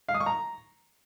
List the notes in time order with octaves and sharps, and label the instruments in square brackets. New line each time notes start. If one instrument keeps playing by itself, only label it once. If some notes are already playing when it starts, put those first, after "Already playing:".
[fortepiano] F5
D#6
C#6
A#5